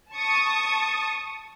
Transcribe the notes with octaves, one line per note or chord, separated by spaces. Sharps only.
A5 C#6 D#6